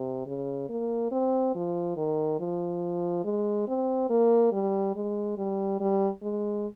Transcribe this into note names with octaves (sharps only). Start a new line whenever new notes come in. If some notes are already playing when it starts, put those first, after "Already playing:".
Already playing: C3
C#3
A#3
C4
F3
D#3
F3
G#3
C4
A#3
G3
G#3
G3
G3
G#3